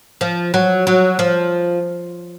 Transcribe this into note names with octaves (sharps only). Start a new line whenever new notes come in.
F3
F#3
F#3
F3